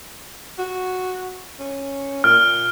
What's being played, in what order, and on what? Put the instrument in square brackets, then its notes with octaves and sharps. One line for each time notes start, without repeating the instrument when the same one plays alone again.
[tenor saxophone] F#4
C#4
[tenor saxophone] A#2 [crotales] F6